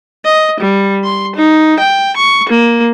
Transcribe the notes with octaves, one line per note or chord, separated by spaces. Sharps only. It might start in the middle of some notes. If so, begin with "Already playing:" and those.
D#5
G3
C6
D#4
G5
C#6
A#3